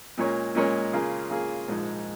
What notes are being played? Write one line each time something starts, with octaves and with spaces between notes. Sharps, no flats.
A#2 G#3 C#4 A#4 C#5
A#2 G#3 C#4 A#4 C#5
C#3 A#3 F4 G#4
C#3 A#3 F4 G#4
A#1 G#2 F3 G#3 D#4